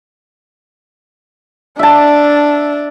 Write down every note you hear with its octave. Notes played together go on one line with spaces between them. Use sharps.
D4 E5 A5